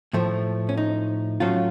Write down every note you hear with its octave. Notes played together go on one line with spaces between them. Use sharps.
A2 F3 A3
C#4
D#4
A2 F#3 A3 C#4 F4